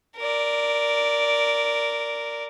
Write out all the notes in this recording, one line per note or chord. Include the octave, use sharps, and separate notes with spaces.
A#4 D5